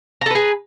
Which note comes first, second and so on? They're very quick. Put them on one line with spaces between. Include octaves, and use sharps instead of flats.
A#5 A4 B4 G#4